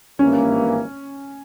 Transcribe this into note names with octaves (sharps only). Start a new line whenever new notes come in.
G#1 G2 E3 A#3 C#4